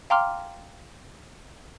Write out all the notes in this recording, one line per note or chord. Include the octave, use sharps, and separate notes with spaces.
F5 G5 A#5 C6 D6 F6